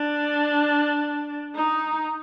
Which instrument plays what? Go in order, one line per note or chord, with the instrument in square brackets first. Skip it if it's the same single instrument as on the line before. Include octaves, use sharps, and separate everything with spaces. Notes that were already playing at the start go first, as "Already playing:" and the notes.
Already playing: [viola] D4
D#4